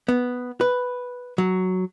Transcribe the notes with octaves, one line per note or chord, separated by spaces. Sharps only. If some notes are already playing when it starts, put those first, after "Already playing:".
B3
B4
F#3